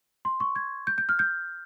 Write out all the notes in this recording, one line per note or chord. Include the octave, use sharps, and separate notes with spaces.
C6
C#6
G#6
G6
G6
F6
G6